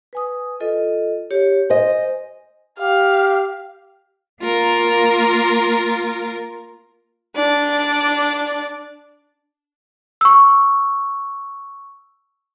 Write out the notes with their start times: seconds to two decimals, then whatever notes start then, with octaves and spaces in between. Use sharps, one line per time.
0.13 B4 G#5 D#6
0.60 F4 A4 D#5
1.31 G4 C#5
1.70 C5 D#5 G#5
2.79 G4 F5
4.42 A#3 F4 A#4
7.36 D4 D5
10.21 C#6 E6